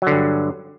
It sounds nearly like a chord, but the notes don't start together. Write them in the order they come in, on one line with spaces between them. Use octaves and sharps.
F#3 D3 G2